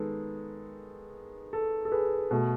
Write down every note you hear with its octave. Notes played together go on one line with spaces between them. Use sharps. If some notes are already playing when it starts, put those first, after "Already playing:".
Already playing: D#3 G#3 B3 A4
A4
A4
G#4 B4
B2 A3